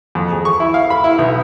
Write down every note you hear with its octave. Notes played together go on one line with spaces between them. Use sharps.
F2
G#4
C#6
E4
F5
B5
E4
B1